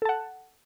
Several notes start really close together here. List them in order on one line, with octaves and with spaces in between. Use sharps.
A4 A5 F#5